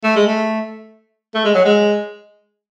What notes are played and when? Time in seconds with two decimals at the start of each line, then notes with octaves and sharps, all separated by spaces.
0.04 A3
0.16 G#3
0.27 A3
1.35 A3
1.45 G#3
1.55 F#3
1.65 G#3